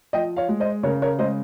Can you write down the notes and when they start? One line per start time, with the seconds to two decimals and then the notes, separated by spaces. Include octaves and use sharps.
0.13 F3 D#5 G5
0.37 C#5 F5
0.49 G#3
0.60 C5 D#5
0.83 C#3 A#4 C#5
1.02 A#4 C#5
1.19 G#3 C5 D#5